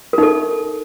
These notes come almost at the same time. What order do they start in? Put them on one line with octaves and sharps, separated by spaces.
A#4 D#4 A4